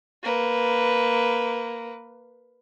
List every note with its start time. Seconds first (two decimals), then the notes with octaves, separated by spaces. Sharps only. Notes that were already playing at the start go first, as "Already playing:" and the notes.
0.23 A#3 B4